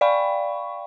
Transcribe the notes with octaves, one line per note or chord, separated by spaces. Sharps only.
D5 F5 G5 B5 C#6